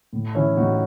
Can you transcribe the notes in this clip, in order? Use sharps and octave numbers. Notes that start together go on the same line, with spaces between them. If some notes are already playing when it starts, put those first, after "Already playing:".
A2
E3 C#4 E4
A2 D#4 F#4